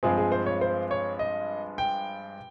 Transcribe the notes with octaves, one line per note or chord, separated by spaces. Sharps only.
G2 F3 G#3 C4 G#4
G#4
C5
C#5
C5
C#5
D#5
G5